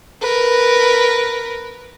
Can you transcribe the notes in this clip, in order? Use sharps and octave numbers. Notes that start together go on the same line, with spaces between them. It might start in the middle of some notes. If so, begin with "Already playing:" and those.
A#4 B4